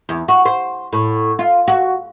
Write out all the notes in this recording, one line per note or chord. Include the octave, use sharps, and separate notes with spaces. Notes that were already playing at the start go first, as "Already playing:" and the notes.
E2
F#4
C5
A2
F4
F#4